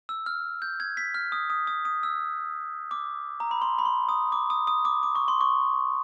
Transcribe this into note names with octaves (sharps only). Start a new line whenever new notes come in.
E6
F6
G6
G#6
B6
F6
D#6
D#6
D#6
D#6
E6
D6
A#5
B5
C6
B5
C6
D#6
D6
D#6
D#6
D6
D6
C#6
C6
C#6